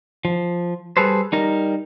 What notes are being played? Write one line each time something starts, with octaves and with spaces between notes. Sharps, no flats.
F3
G3 G#4 A4 B4 C5
G3 D#4 A#4